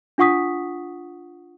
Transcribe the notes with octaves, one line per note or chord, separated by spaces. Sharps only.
D4 F4 F#5 C#6 D#6 B6